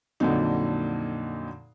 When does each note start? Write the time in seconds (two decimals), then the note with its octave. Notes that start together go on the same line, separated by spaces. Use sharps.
0.20 F2 A#2 D3 F#3 D#4